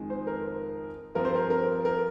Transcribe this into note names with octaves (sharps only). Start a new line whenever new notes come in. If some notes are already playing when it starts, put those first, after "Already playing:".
Already playing: F2 D#3 G#3
C5
A#4
G2 F3 C4 A#4
C5
A#4
A#4
A#4